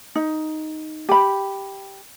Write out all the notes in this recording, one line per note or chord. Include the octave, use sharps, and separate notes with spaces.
D#4
G4 B5